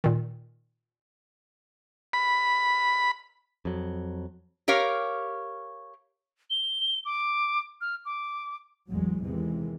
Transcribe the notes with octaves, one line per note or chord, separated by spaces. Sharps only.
A#2 D#3
B5
F2 F#3
G4 A#4 C#5 F5
G7
D6
F6
D6
A1 E2 F#3 G#3
E2 C3 D#3 E3 G#3